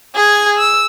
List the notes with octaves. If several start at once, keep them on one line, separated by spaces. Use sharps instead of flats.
G#4 G#6
E6